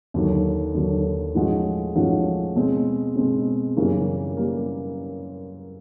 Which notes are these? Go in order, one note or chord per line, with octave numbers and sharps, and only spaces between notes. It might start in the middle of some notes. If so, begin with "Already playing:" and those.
D#2 D3 F#3
D#2 D3 F#3
A2 F3 G#3 C#4 F#4
A2 F3 G#3 C#4 F#4
B2 G#3 C4
B2 G#3 C4
F#2 C#3 E3 G3 A#3
G3 A#3